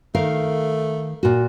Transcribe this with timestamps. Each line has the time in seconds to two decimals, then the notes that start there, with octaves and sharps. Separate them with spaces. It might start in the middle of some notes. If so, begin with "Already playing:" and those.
0.15 D#3 A3 A#4 F5
1.23 A#2 F#4